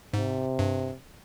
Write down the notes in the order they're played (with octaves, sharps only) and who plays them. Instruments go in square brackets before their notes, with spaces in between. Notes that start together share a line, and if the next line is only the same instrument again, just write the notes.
[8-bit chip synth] G#2 [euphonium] C3
[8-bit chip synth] G2